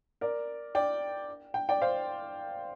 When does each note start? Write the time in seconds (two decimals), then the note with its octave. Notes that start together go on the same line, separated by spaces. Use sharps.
0.21 A#4 D5
0.75 D5 G5
1.54 G5
1.69 D5 G5
1.82 C5 F5